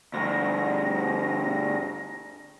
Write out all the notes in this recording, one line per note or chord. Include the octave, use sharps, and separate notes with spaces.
D2 G2 A#6